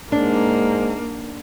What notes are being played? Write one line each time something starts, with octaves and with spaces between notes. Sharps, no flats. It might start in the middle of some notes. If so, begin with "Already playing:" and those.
G#2 A#3 D4